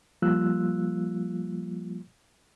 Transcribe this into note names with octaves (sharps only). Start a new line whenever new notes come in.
F3 G3 A#3 F4 E6 F#6